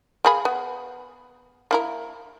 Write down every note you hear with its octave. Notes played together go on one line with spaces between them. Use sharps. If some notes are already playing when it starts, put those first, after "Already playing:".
A#3 G#4 B5
B3
A#3 E4 A#4